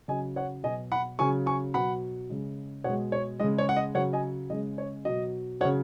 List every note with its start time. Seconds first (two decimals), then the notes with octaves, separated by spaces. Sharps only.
0.08 C#3 F#3 D#5 G#5
0.36 C#5 F#5
0.63 B2 F#3 D#5 G#5
0.92 F#5 B5
1.19 C#3 F#3 G#5 C#6
1.46 G#5 C#6
1.74 B2 F#3 F#5 B5
2.30 C#3 G#3
2.84 B2 G#3 C#5 F#5
3.12 C#5
3.40 C#3 G#3 D#5
3.58 C#5
3.69 F#5
3.76 D#5
3.95 C#3 F#3 C#5 F#5
4.13 D#5 G#5
4.50 C#3 G#3 D#5
4.78 C#5
5.05 B2 F#3 D#5
5.60 F#3 C#5 F#5
5.65 C#3